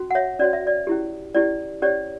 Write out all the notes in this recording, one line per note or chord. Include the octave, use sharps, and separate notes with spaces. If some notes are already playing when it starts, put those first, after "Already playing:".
Already playing: C#4 F#4
F#5
C#5 E5
C#4 F#4 C#5 D5
E5
D5
C#4 E4 G4
C#4 E4 G4 D5
C#4 G4 C#5 D5